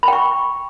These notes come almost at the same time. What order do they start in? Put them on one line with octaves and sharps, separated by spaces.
B5 G5 C#6